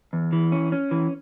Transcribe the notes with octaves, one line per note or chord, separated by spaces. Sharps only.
E2
E3
C#4
C#4
E3